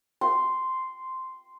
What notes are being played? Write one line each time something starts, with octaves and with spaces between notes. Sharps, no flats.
C6